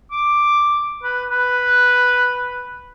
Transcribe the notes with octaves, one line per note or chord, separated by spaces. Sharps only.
D6
B4
B4